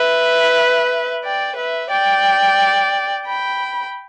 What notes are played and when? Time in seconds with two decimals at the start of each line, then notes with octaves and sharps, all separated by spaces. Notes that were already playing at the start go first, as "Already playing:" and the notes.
Already playing: B4 E5
1.24 D5 G5
1.57 B4 E5
1.90 D5 G5
3.25 G5 B5